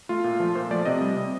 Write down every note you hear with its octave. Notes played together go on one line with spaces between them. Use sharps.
A3 F4
A#2
F3 A3
A#2 C5
F3 A3 D5
C3 D#5
G3
C3